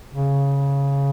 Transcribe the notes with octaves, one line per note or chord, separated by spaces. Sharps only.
C#3